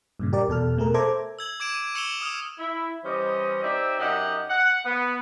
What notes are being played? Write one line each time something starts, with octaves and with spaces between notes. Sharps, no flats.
G2 A#2 C#3
G4 A#4 D5
E2 B2 A4 F6
B2 A3 G#4 A#4
A4 C5 E5 A#5 D6 G#6
E6 G#6 F#7
D6 G#6 D7 E7
D#7
C#6 E6 C#7 E7 F7 G7
D#6 F6
E4
E3 G3 C#4 C5 D#5
C4 D#4 G4 D5 E5
F#2 D#4 G4 D#5 E5 F#5
F#5
B3